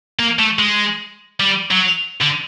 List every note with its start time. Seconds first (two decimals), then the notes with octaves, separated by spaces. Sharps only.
0.19 A#3
0.39 A3
0.59 G#3
1.40 G3
1.71 F#3
2.21 D3